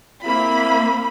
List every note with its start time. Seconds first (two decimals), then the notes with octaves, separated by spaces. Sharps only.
0.24 A#3 C4 E4 B5